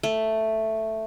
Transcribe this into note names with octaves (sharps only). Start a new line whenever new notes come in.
A3